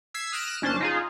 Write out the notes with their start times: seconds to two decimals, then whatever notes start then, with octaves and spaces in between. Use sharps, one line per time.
0.14 E6 G#6 B6 C7
0.32 D#6 F6 F#6 A#6 D7 E7
0.62 G1 C#4 D4 C5 A5
0.81 D#4 F4 G#4